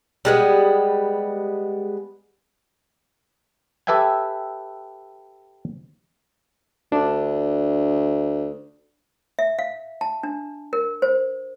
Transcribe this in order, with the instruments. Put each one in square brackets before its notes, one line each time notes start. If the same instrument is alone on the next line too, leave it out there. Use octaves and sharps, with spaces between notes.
[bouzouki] G3 G#3 B3
[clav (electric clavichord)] G4 A4 B4 E5 G5 G#5
[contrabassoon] D2 [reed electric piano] D4
[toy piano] E5
F5
A5
D4
A#4
C5